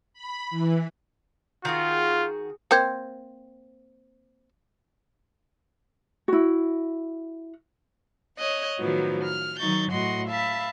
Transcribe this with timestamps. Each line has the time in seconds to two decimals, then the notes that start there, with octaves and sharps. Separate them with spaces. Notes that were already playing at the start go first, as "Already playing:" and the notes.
0.14 B5
0.51 E3
1.65 D#3 F4 F#4 G#4
2.71 A#3 C4 C5 G5 G6 G#6
6.28 E4 F#4
8.37 C#5 D#5 F#6
8.78 A2 D#3 F3 F#3 B3
9.22 F6
9.58 D#3 F#3 D#4 C#6 G6 A6
9.91 A2 F#4 D#5 F#5 C6
10.27 E5 F5 A5 B5